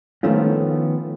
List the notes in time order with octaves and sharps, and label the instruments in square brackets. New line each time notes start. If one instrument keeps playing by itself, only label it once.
[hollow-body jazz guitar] D#3 F3 A3 B3 C#4 F4